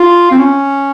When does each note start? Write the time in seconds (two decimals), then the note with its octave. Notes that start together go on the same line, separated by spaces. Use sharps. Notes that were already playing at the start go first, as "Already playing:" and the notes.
Already playing: F4
0.31 C4
0.38 C#4